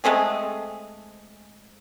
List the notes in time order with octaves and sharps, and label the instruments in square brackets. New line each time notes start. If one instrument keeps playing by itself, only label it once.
[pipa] G#3 A3 C4 G#4